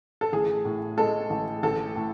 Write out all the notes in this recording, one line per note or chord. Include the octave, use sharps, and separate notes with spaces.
A4
A1 G#4
A2
G#3 A4
A1
A1 A4
A2